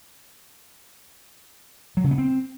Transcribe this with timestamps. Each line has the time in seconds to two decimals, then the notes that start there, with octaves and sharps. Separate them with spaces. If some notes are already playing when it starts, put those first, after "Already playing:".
1.97 F#3
2.04 C#3
2.11 B3
2.18 C4